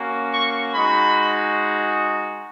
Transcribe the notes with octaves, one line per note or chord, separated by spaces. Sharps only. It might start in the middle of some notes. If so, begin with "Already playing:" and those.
Already playing: A#3 C#4 F#4
C#6
G#3 D#4 F#4 B5